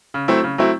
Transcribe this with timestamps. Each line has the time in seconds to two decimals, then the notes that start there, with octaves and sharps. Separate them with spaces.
0.14 C#3
0.28 F#3 A3 C4 E4
0.44 C#3
0.58 F#3 A3 C4 E4